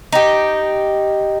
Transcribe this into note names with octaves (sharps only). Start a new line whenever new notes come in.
D#4 G4